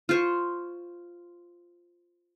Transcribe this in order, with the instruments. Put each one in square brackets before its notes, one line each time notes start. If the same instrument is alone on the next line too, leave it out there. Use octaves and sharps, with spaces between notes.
[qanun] F4 C5 C#6